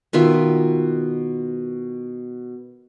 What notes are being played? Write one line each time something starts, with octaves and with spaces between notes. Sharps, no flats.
B2 D#3 F4 E5